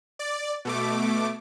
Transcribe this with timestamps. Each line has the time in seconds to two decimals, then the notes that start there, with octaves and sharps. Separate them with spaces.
0.19 D5
0.65 B2 A3 D6